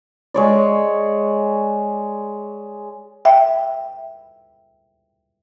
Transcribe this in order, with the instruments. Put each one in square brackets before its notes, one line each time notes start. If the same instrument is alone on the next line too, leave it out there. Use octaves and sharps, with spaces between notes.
[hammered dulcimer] G#3 C#5 D5
[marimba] E5 G5